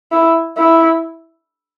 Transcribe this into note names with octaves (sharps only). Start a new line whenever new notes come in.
E4
E4